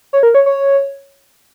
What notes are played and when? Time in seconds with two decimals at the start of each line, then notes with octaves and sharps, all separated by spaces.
0.13 C#5
0.23 A#4
0.35 C#5
0.46 C#5